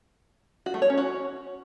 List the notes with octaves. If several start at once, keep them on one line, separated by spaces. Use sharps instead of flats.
F#4
A3
C#5
C#4
F#4